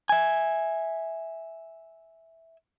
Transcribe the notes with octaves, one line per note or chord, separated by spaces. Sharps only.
E5 G#5